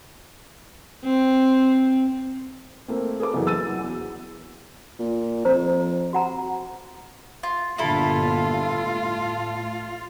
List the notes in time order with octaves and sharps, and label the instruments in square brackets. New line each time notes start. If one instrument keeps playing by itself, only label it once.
[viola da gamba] C4
[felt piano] A3 A#3 C4
G#4 A4 B4 D6
F#1 E2 E3 F#3
E6 A6 D#7
F#3
E2
[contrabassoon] A#2
[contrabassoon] F2 [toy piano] C5 A#5
[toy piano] F#4 F#5 A#5
[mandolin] F4
[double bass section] G1 A#2 D3 [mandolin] E4 A4 B5 [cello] F4
[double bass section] A2